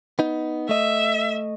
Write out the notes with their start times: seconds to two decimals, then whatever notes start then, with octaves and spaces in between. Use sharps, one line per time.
0.19 B3 D#4
0.69 A3 D#5 E5